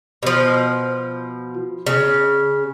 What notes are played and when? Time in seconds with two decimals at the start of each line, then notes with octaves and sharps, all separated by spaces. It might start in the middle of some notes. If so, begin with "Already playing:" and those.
0.23 B2 F3
1.86 C#3